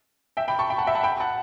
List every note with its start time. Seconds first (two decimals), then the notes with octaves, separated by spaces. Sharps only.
0.37 E5 G5
0.48 G5 B5
0.59 A5 C#6
0.70 G5 B5
0.78 F#5 A5
0.87 E5 G5
0.95 F#5 A5
1.03 G5 B5
1.20 F#5 A5